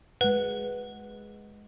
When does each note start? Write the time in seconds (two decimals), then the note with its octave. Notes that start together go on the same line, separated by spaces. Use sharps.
0.21 G#3 B4 F#5